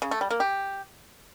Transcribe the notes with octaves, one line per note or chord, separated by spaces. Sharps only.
C#3
A3
G3
A#3
G4